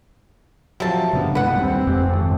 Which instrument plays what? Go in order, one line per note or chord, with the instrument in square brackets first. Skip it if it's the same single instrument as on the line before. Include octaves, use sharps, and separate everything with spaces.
[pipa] C3 A5 [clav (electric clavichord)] F3 F#3
[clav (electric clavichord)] G2 A#3 B3 [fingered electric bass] C#3 D4
[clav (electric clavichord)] C2 [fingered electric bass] G2 G#3 [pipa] B4 F#5
[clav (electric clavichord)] D#2 [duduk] C4
[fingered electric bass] F2 G#3 [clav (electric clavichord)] G4
[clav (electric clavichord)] G#1 A4